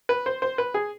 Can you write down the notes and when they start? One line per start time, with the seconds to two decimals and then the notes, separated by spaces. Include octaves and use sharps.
0.09 B4
0.26 C5
0.42 C5
0.58 B4
0.74 G#4